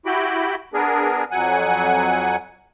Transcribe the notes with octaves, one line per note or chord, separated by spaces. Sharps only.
E4 F#4 G4 G5 B5
B3 D4 G#4 A#4
F2 F#3 F#5 G#5